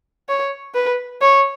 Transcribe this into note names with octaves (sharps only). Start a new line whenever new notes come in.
C#5
B4
C#5